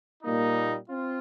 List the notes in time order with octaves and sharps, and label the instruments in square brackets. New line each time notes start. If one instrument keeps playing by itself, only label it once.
[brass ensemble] A#2 G3 A#3 D#4
C4 F4